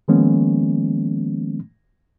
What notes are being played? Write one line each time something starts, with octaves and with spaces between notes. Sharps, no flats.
D#3 F3 G#3 A#3 B3 C#4